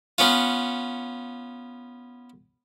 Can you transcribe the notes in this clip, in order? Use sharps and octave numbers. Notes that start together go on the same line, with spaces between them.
B3 C#4 F4